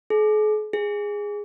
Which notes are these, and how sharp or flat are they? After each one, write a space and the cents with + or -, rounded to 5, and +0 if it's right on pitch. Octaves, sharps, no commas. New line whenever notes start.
G#4 +45
G#4 -10